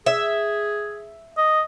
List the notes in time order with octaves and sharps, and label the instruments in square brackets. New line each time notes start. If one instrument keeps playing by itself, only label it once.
[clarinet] G#4 [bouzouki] E5
[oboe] D#5